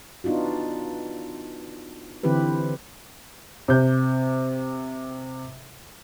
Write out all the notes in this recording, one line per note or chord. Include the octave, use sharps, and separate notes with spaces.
B3 D4 D#4 F4 F#4
D3 E3 C4 E4 G4 B4
C3 G6